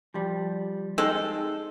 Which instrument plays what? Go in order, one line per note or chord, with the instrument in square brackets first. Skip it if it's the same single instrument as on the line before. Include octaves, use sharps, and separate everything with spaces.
[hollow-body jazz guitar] F3 G3
[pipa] G#3 C4 A4 [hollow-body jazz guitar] D#4